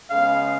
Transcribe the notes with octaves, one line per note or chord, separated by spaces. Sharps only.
C#3 G#3 B3 F5